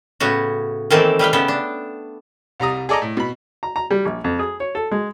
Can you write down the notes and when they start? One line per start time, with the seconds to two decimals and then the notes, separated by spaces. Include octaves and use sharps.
0.20 A2 C#3 B3 F#4
0.90 D#3 E3 A3 A#3 C4 A4
1.19 G3 B4 F5 G5
1.33 C#3 B3 A4 G5
1.48 D4
2.60 C2 G3 A#5 D#6
2.89 G#4 A4 D5 D#5 A#5
3.02 A2
3.17 B2 B5
3.63 A#5
3.76 A#5
3.91 G3
4.05 A#1
4.24 F2
4.39 G#4
4.60 C#5
4.75 A4
4.91 G#3